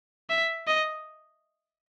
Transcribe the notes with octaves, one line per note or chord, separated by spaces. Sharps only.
E5
D#5